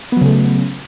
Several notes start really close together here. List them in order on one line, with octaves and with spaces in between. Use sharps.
B3 F#3 C#3 A3